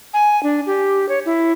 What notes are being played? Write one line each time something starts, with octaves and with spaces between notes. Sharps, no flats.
G#5
D4
G4
C#5
E4